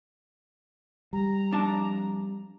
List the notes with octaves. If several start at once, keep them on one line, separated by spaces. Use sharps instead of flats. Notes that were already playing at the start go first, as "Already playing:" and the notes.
G3 A#5
F2 D4 A5